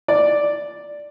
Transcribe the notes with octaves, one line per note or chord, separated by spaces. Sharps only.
D5